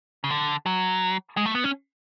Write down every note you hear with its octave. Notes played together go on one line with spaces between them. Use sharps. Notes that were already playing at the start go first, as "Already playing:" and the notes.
C#3
D3
F#3
G#3
A3
B3
C#4